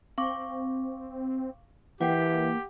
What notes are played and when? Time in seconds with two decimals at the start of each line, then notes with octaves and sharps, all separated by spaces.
0.18 C4 F5 C#6 D6
2.01 E3 A#3 G4 F#5 G5